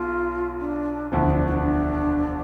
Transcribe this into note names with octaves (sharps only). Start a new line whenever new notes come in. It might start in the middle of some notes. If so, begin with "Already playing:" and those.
Already playing: B1 F4
D4
E1 D2 D3 F3 E4
D4
E4
D4